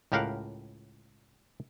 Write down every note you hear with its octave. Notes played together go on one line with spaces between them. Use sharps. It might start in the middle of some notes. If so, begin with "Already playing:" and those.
C#2 A2 G4 A#4 F5 F#5